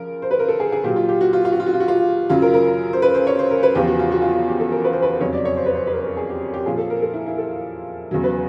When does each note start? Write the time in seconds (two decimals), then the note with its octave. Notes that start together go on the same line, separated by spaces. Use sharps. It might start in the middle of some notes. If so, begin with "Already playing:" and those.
Already playing: C#3 F3 A#4
0.22 C5
0.31 B4
0.39 A#4
0.48 A4
0.60 G#4
0.72 G#4
0.84 A#2 F#3 G4
0.96 F4
1.09 G4
1.21 F#4
1.33 F4
1.45 F4
1.52 F#4
1.60 F4
1.66 F#4
1.74 F4
1.80 F#4
1.88 F4
2.30 F#2 C#3 F#3 F4
2.42 A#4
2.54 A#4
2.93 C5
3.02 B4
3.14 C5
3.27 C#5
3.39 C5
3.51 A#4
3.63 B4
3.75 E2 C#3 F3 G4
3.87 F#4
3.99 F4
4.11 F#4
4.22 F4
4.32 F#4
4.48 G4
4.60 A4
4.72 A#4
4.84 B4
4.93 C5
5.02 B4
5.20 F2 C#3 F#3 C#5
5.33 D5
5.45 C#5
5.57 C5
5.66 B4
5.75 C5
5.87 B4
5.93 A#4
6.05 A#4
6.17 G#4
6.29 G4
6.54 G4
6.66 A#2 F3 G#4
6.78 A4
6.90 A#4
7.02 A4
7.14 E4
7.26 E4
7.38 A4
8.11 E2 C#3 F#3
8.24 B4